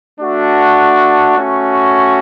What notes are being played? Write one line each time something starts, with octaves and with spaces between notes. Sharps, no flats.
A3 D4 F#4
A3 C#4 F#4